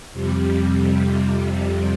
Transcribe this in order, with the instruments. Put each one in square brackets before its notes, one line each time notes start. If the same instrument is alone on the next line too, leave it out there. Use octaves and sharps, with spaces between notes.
[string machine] F2 C3 G3